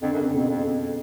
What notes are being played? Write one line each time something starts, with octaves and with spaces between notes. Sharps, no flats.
F2 D3
F#2
F2 C#3
F2 B2
F2
F2